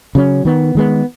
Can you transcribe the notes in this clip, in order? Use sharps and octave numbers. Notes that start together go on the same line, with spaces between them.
C#3 F#3 C#4
D#3 B3
D#3 G#3 B3